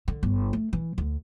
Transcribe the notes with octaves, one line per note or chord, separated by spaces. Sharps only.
D3
G1
A3
E3
D2